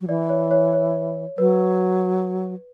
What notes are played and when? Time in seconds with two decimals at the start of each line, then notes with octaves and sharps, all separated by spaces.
0.01 F#3
0.08 E3 D5
0.29 C#5
0.51 C#5
0.73 C#5
1.38 F#3 B4